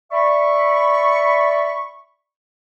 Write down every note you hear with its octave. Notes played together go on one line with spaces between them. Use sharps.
D5 E5 B5 C#6